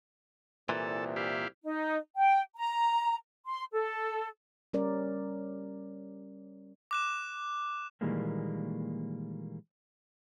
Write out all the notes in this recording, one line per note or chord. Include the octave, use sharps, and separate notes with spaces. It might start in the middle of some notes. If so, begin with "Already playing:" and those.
C2 A#2 E3 A4
E4 G4 F5
D#4
G5
A#5
C6
A4
G3 C#4 A#4 D5
D6 F#6 E7
A#2 D#3 E3 G3 G#3 A#3